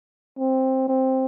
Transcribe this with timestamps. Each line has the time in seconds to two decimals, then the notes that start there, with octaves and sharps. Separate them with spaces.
0.39 C4
0.88 C4